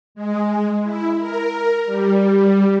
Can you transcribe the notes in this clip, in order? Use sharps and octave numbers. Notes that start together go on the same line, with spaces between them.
G#3
E4
A#4
G3